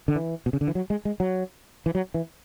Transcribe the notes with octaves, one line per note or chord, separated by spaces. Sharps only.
D3
E3
B2
C#3
D3
E3
F#3
G#3
G#3
F#3
E3
F#3
E3